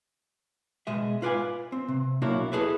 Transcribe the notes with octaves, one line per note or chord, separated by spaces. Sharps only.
B2 G#3 D#5 E5
F4 B4 D5 E5 G#5
C4
C3
B1 A#3 D4 E4 F#4 C#5
E4 G#4 A4 B4 D#5 E5